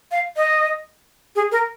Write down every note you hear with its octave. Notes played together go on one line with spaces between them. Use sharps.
F5
D#5
G#4
A#4